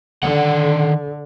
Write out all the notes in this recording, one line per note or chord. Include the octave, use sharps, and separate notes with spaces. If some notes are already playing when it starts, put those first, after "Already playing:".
D3 D#3 F#5